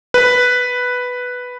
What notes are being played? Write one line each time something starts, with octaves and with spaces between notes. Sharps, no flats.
B4